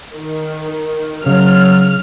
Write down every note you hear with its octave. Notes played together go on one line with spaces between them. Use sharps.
D#3
C#3 F#3 F6